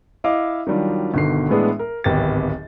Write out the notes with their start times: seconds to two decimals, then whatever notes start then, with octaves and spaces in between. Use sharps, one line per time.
0.24 E4 D#5 F5 D6
0.67 D#3 F#3 G3 D4 F4
1.14 G1 B2 D3 D#3 C7
1.49 A2 E3 G#3 B3 D4 G#4
1.79 A#4
2.04 D1 G#1 B3 G4 A6